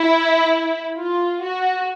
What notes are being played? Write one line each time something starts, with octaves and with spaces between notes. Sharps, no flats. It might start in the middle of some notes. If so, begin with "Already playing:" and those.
Already playing: E4
F4
F#4